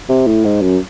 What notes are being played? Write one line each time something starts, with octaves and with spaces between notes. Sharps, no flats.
C3
A2
G#2
F#2